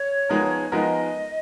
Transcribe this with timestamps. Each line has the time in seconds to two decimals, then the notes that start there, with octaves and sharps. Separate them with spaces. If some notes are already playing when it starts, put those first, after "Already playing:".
Already playing: C#5
0.29 F3 G#3 B3 D#4 A#4
0.72 F3 G#3 B3 D#4 A#4 D#5